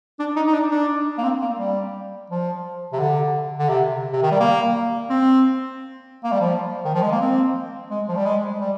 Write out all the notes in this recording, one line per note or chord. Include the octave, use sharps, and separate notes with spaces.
D4
D#4
D#4
D4
D4
A#3
C4
A#3
G3
F3
C3
D3
D3
C3
C3
D#3
G3
A#3
C4
A#3
G3
F3
D#3
F3
G#3
A#3
C4
G#3
F3
G3
G#3
G3